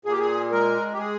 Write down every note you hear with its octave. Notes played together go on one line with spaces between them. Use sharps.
A#2 G#4
G4
G#4
G#3 A#4
G4
G#3 G#4